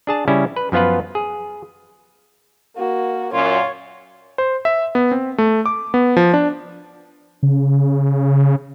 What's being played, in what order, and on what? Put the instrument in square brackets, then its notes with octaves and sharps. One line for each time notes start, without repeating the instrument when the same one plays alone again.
[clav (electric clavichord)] D4 G#4 A5
C#3 G3 C#4 E4
B4
F#2 F3 B3 F4 B4
G#4
[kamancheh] A#3 F#4
[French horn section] F#2 A#2 [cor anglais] F4 [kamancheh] C#5
[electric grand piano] C5
E5
B3
C4
A3
D6
B3
F3
D4
[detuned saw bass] C#3